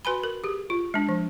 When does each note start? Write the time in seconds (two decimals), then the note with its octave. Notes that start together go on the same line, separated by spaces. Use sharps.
0.05 F#4 B4 G#5 B5
0.24 A#4
0.44 G4 G#4
0.70 F4
0.94 G#3 D4
1.09 F3